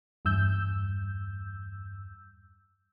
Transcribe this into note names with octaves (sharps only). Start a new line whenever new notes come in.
E2 G2 E6 G6